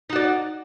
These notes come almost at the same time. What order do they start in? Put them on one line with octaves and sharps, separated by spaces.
D#4 F#4 D5